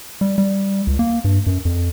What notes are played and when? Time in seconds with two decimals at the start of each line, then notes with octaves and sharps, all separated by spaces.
0.21 G3
0.38 G3
0.87 C#2
0.99 A#3
1.24 G2
1.47 F#2
1.65 F2